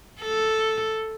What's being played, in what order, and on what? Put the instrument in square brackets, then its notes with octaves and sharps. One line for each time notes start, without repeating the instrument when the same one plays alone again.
[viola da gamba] A4